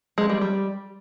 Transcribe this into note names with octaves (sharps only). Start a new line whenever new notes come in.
G#3
G3
G3